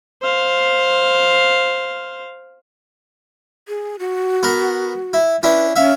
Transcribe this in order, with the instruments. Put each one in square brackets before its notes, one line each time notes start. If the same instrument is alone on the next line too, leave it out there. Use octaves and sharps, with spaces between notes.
[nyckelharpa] C5 F5
[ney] G#4
F#4
[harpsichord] B3 A#4
E4
[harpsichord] C#4 D4 E4 [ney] B4
[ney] C#4 [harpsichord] E5 F5